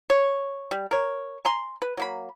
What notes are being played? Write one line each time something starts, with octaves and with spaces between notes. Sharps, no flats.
C#5
G3
A#4 C#5
G#5 A#5 C6
B4
F#3 A#3 B5